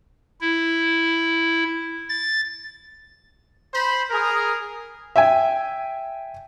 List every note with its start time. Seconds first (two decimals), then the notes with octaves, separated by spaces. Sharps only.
0.41 E4
2.09 A6
3.72 C5 B5
4.10 G#4 A#4
5.16 E5 G5 G#5